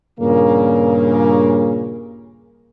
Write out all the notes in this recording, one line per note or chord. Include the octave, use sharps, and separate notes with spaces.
G2 A#2 C#3 A#3